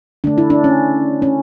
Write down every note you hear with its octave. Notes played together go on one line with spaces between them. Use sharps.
D3 A3 D4
E4
D4
C#4
C#4